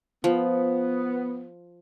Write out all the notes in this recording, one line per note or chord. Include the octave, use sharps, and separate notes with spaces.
F3 B3